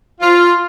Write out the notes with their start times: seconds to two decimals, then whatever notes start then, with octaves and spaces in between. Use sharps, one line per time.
0.21 F4